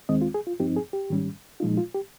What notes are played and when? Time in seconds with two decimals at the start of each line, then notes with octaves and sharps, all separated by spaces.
0.09 D#2 D#3 G#3 C4 D#5
0.22 F4
0.34 G#4
0.47 F4
0.60 G2 F3 C4 D#4 G4
0.77 G#4
0.93 G4
1.10 G#2 D#3 G3 C#4
1.60 A#2 F3 G#3 D#4 F4
1.77 F4
1.95 G4